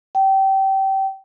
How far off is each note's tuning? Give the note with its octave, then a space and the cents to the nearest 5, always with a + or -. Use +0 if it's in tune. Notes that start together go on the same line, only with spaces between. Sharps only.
G5 -25